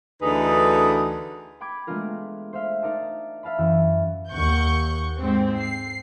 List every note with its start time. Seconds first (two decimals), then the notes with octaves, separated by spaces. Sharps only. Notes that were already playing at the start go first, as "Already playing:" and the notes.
0.22 D2 D3 E3 D#4 G#4 B4
1.60 G5 B5 D6 G#6
1.87 G#3 A3 B3 D4 F4 A#4
2.53 C5 E5 F5
2.82 D#4 A#4 D5 A5
3.43 E5 F5 A5 B5
3.58 F#2 E3 G5 E6
4.29 D#2 F#5 C#6 G6
5.19 G#2 C4
5.60 C7